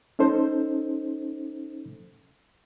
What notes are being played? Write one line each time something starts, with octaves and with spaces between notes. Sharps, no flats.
C#4 D#4 A4 C5